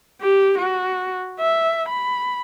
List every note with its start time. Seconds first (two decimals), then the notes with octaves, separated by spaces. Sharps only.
0.21 G4
0.58 F#4
1.40 E5
1.89 B5